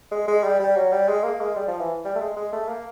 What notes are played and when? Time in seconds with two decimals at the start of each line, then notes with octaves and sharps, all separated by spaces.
0.11 G#3
0.28 G#3
0.44 G3
0.60 G3
0.76 F#3
0.92 G3
1.09 G#3
1.24 A#3
1.41 G#3
1.56 G3
1.68 F3
1.80 E3
2.05 G3
2.15 A3
2.21 G#3
2.36 G#3
2.53 A3
2.68 A#3